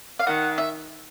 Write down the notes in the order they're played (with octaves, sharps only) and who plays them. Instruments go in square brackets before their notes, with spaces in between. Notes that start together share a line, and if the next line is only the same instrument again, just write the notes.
[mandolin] F5
[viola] D#3 [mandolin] F#5
[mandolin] E5